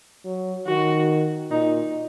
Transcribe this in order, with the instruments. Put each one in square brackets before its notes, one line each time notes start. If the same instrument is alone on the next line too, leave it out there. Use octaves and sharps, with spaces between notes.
[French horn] F#3
[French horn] D#3 [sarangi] F#4
[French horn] A#2 [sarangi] D#4